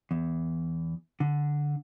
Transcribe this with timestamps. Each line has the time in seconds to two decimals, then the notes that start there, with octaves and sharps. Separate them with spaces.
0.11 E2
1.20 D3